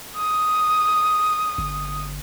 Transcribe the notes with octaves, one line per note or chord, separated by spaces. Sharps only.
D#6
G1